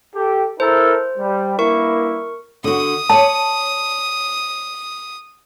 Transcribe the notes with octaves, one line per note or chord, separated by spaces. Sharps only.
G4 A4
E4 A4 A#4 C5
G3
G2 A#3 E4 A#4 C#6
D3 F#4 D#6
C#5 D5 A5